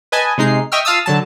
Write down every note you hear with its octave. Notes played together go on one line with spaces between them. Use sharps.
B4 D#5 G#5 A5
C3 G#3 D#4 C7
D#5 E5 G5 C#6 E6 F6
F4 F5 A5 D#6 E6
D3 F#3 A5